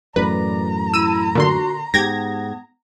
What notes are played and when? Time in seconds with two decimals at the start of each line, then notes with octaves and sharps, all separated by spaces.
0.16 F#2 A2 E3 B4 D5 A#5
0.94 E4 E6 D#7
1.35 A#2 D3 F#4 C6
1.94 G#2 B3 G4 G#6 A#6